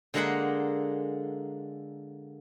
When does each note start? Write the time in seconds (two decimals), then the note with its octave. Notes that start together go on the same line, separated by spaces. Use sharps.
0.14 D3 G#3 A#3 G#4 F#5 B5